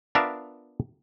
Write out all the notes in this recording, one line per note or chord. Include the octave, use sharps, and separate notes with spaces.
B3 D4 F4 A#4 E5 F5